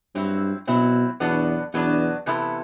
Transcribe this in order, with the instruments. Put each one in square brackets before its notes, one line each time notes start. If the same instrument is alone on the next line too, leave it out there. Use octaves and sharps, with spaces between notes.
[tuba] G2 [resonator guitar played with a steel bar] F#3 C4 E4
[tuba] B2 [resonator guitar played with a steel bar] F#3 C4 E4
[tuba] E2 [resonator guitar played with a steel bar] B2 F#3 B3 D4
[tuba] E2 [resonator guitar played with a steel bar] B2 F#3 B3 D4
[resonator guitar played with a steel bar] C3 E3 B3 E4 A4